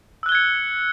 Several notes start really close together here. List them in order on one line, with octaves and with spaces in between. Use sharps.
E6 F#6 G7 G#6 C#7